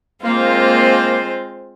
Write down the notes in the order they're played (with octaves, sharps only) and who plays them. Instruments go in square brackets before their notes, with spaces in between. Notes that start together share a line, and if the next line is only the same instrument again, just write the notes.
[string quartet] G#3 C4 F4 C5 [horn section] A#3